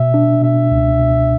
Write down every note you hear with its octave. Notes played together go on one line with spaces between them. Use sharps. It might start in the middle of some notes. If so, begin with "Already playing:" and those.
Already playing: B2 E5
D4
B2 E5
C#2
B2